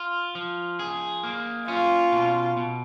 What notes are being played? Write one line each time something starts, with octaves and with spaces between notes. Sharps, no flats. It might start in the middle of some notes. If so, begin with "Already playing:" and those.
Already playing: F4
F3
G#4
A#3
C#4 F4
B2
B2